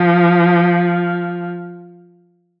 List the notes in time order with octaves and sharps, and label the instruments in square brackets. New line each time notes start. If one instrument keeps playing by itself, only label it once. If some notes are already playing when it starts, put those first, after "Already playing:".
Already playing: [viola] F3